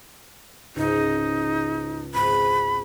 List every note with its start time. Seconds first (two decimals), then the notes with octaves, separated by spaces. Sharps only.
0.76 C#2 G#2 D#4
2.14 G#1 B5 D#7